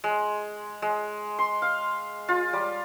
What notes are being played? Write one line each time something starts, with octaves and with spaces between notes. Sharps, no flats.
G#3
G#3
C6
F5
F4
G3